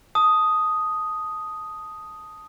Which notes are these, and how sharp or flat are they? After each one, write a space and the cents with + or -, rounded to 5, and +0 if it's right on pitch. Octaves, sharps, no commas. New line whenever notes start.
A5 +0 D#6 +0